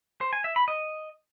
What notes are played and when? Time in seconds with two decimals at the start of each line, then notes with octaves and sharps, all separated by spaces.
0.21 C5
0.33 G#5
0.44 E5
0.56 B5
0.68 D#5